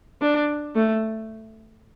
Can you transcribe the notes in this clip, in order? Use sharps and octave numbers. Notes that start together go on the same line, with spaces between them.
D4
A3